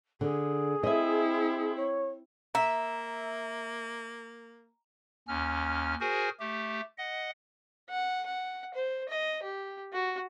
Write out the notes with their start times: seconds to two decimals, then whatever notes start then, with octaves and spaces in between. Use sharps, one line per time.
0.21 D3 G#4
0.83 C4 E4 D#5 E5
1.76 C#5
2.55 A#3 E5 A#5
5.28 D#2 C#4 F6
6.00 F#4 G#4 A#4 C5 G#5
6.40 A3 G4
6.98 D#5 F#5
7.90 F#5
8.26 F#5
8.74 C5
9.09 D#5
9.43 G4
9.93 F#4